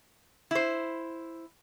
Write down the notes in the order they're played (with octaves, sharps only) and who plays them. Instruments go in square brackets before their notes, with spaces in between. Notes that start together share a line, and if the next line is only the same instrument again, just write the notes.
[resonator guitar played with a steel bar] E4 C5